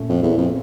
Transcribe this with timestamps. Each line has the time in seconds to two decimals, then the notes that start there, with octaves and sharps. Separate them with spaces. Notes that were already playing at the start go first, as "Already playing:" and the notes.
Already playing: A#2 A3 C#4
0.09 F2
0.23 E2
0.37 F2